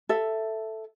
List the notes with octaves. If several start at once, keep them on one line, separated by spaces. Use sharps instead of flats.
A4 E5